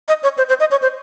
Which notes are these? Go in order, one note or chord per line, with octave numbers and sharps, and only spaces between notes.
D#5
C#5
C5
C5
D#5
C#5
C5